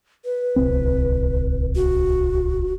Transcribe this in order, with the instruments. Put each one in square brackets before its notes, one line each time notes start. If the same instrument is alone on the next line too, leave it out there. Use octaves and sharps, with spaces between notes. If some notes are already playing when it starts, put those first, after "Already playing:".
[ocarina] B4
[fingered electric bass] D1 C2 C4
[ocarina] F#4